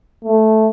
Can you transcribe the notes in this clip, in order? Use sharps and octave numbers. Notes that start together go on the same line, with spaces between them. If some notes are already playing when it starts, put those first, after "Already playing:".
A3